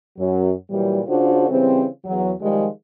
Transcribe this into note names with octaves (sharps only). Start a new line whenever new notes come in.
F#2 F#3
A#2 E3 F#3 G3
C#3 D4 F4 F#4 A4 C5
C#3 E3 G3 C4
E2 F#3
D#3 F3 G3 G#3